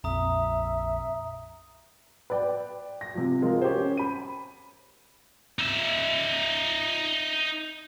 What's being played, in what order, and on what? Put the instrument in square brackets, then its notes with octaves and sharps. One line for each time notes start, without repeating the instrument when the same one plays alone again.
[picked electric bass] A#1 [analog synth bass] F2 [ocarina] E5 [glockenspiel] A#5 D#6
[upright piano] B4 D5 G5
A#6
C3 F3
F3 G#3 F4 A#4
C#4 G4 A#4 C5
B5 D#7
[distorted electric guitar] D#4 E5